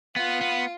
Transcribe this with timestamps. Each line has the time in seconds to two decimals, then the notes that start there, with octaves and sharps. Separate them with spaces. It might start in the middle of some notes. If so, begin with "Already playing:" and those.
0.16 B3 F4
0.41 B3